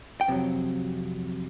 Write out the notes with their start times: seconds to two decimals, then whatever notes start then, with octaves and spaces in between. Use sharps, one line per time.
0.21 G5
0.28 F2 C3 F#3